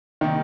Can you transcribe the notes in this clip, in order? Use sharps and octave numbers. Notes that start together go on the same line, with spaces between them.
C3 D#3 G3 A#3